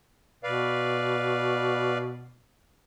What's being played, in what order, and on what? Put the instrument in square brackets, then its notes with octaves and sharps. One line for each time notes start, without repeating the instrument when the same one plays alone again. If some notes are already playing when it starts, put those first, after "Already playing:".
[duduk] B2 [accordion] B4 D5 F5